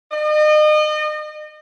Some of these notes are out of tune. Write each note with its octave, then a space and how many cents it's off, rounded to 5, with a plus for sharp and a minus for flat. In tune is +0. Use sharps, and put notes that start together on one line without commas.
D#5 -35